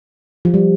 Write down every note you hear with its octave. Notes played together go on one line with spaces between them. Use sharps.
F3
G3